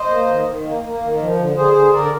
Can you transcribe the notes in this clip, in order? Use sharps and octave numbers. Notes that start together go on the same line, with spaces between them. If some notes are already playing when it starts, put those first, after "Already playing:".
Already playing: C5 D#5
A#3
D#3
D#3
A#3
A#3
D#3
F3
D3
D3 G#4 C5
D3
D3 A#4 D5